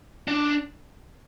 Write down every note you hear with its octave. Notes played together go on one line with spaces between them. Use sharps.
D4